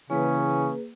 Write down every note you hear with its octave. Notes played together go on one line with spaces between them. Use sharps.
C#3 E3 A#3 C#4 G#4 B4